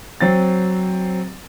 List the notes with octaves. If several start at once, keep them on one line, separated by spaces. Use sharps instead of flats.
F#3 C4 A6